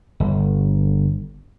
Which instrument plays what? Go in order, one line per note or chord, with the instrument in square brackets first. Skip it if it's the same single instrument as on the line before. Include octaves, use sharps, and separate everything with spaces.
[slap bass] G1